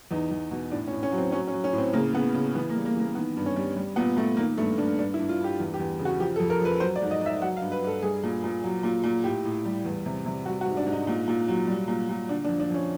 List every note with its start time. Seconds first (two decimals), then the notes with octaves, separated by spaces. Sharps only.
0.11 E2 D#4
0.31 E2
0.51 B2
0.72 A2 D4
0.88 C#4
0.92 A2
1.03 C#4
1.12 F#3
1.18 C4
1.32 F#3 C#4
1.47 C#4
1.53 F#3
1.64 C#4
1.73 A2
1.78 C4
1.93 C#3 A#3
2.13 C#3 B3
2.34 C#3
2.55 E3 B3
2.70 A#3
2.75 G3
2.85 A#3
2.96 E3 A#3
3.15 D#3 B3
3.36 G2
3.46 C#4
3.56 G3
3.76 G3
3.96 A#2 B3
4.17 A#2 A3
4.37 D#3 A#3
4.58 G2 A3
4.78 G2 D4
4.99 G2 D4
5.14 E4
5.19 G2
5.29 F4
5.39 G2 G4
5.60 E2
5.74 G4
5.79 E2
5.99 C#3
6.05 F#4
6.19 F3 G4
6.36 A4
6.40 F2
6.50 A#4
6.61 F3 B4
6.80 F#3 C5
6.96 D5
7.02 G#2
7.11 D#5
7.21 G#2 E5
7.42 F#3 F#5
7.57 F5
7.62 G2
7.72 B4
7.82 G2 A4
8.02 G3 G#4
8.23 A#2
8.44 A#2
8.64 F#3
8.83 A#2
9.04 A#2
9.24 A2 G4
9.45 A2
9.65 G3
9.85 E2
10.06 C3
10.26 C3
10.46 G3 F#4
10.61 F#4
10.66 G#2
10.77 D4
10.86 G#2
10.92 D#4
11.07 A#2
11.28 A#2
11.48 F#3
11.67 G3
11.88 A#2
12.09 A#2
12.29 D3 D4
12.44 D4
12.49 F2
12.60 D4
12.70 F2 C#4